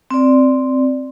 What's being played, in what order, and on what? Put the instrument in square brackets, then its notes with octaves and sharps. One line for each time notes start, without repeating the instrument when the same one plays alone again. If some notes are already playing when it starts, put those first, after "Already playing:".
[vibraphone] C4 D5